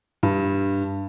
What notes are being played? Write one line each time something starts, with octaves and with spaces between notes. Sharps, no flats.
G2